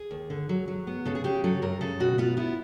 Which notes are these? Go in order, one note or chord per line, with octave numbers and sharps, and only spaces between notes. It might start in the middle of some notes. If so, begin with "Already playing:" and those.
Already playing: G#4
D#2
D3
F#3
F#3
B3
C#3 A4
G#4
C#3 G4
F#3 A4
F#2 A#4
C#3 A4
B2 F#4
B3 F4
B3 E4